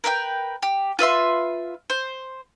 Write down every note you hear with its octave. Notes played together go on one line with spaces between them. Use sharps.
A#4 B4 F#5 G5
G4
F4 B4 E5 C6
C5